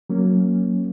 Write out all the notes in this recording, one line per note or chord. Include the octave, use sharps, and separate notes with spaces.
F#3 A#3 C#4